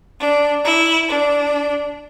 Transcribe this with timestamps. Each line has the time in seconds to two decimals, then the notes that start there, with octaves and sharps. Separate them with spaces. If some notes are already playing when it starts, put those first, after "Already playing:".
0.20 D4
0.64 E4
1.09 D4